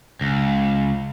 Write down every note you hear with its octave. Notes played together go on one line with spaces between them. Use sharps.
C#2